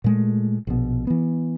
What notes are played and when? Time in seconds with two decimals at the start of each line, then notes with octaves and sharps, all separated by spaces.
0.04 A#2 G#3 A3
0.67 A#1 B2
1.07 E3 B3